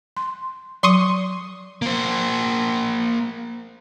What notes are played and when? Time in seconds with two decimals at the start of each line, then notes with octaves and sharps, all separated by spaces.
0.17 C6
0.83 F#3 C6 C#6 D#6
1.82 A#3 C5